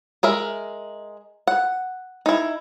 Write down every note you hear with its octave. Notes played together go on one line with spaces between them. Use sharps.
G#3 A#4 E5
F#5
D#4 E4